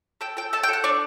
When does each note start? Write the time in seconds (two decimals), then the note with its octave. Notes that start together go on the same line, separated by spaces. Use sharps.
0.21 A4 G5
0.37 A4 G5
0.53 A4 A5
0.63 G5
0.69 A4 F#5
0.84 D4 D5